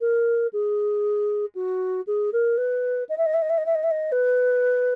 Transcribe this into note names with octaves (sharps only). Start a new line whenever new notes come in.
A#4
G#4
F#4
G#4
A#4
B4
D#5
E5
D#5
E5
D#5
E5
D#5
E5
D#5
E5
D#5
B4